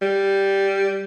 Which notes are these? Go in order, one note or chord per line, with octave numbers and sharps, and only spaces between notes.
G3